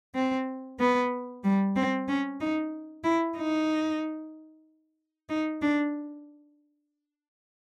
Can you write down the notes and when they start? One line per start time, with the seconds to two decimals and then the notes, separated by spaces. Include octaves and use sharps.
0.15 C4
0.79 B3
1.44 G3
1.76 C4
2.08 C#4
2.40 D#4
3.04 E4
3.36 D#4
5.29 D#4
5.62 D4